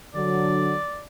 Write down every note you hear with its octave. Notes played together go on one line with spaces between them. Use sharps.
D3 F#3 D5